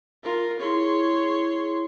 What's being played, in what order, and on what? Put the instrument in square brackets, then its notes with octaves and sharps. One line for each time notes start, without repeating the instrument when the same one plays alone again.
[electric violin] F4 A#4
[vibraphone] E4 G#4 [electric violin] C#5 C6